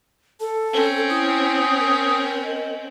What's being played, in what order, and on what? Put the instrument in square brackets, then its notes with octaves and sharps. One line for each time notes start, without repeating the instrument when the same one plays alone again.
[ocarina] A4 [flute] A5
[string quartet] C4 C#4 G5
[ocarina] E4 [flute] D#6
[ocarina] A#4
[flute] D#5